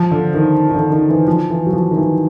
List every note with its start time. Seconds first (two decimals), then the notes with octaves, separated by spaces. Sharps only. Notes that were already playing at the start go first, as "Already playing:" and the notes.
Already playing: F3
0.11 D3
0.34 D#3
0.69 D#3
0.74 D3
0.92 D#3
1.09 E3
1.27 F3
1.51 E3
1.66 F#3
1.73 F3
1.91 D#3
1.96 E3